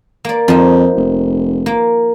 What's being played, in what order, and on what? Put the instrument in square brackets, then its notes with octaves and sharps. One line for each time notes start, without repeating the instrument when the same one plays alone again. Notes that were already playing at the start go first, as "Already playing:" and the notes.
[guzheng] A#3 D5
[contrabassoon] F2 [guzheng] F3 D#4
[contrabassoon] F1
[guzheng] A#3